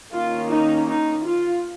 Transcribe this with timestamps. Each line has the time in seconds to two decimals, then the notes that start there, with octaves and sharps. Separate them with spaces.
0.13 D#3 A#3 C#4 F4
0.51 D#4
0.87 D#4
1.25 F4